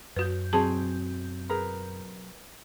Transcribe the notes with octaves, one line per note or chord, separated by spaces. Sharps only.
F#2 F#4 B4 G6
B1 F#3 C4 G#4 A5
G#4 A#4 B4